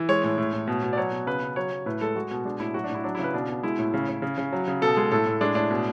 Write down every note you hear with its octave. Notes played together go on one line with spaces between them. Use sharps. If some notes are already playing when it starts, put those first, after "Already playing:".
Already playing: E3
G#3 C#5
A2
A2
A2
B2
B2
D5
F#3 C#5
B2
C#3 B4
C#3
F#3 C#5
F#3
A2 B4
G#3 A4
G#3 F#4
B2
G#3 D4
A2 E4
F#3 F#4
D4
A2 E4
F#3 D4
C#3 E4
B4
B2 D4
B2
G#3 E4
A2
C#3
C#3
C#3
C#3
F#3
C#3
B2 A4
G#3
A2 A4
A2
G#3 D4
A2 D4
B2